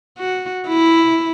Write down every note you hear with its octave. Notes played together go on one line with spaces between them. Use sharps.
F#4
E4